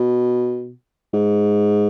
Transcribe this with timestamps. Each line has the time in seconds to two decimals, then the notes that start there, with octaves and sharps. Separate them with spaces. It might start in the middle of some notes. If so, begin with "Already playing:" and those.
Already playing: B2
1.14 G#2